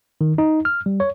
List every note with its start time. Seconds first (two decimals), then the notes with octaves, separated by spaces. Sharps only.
0.21 D#3
0.38 D#4
0.65 F6
0.86 G3
1.00 C#5